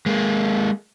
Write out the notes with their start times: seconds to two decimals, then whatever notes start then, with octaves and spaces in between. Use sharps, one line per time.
0.06 G#3 A#3